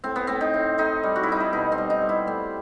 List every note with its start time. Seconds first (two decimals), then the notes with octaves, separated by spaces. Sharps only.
0.04 A2 C4
0.16 B3
0.27 A2 C4
0.41 D#4
0.54 A2
0.78 A2 D#4
1.03 G3
1.16 F#4
1.23 E4
1.28 G3 D#4
1.40 E4
1.53 B2 D#4
1.72 C4
1.78 G3
1.90 D#4
2.02 G3
2.09 E4
2.27 A3 C4